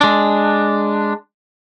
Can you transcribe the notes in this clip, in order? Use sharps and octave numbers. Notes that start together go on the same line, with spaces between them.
G#3 D4